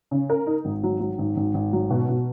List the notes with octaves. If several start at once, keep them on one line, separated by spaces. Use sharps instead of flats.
C#3
A#4
D#4
G#1
F#3
F#3
G#1
G#1
G#1
F#3
B2
B2